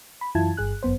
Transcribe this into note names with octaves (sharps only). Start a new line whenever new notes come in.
B5
F#2 E3 E4 F4 A5 G#6
G1 G2 G#4 F#6
G1 F#2 B3 C5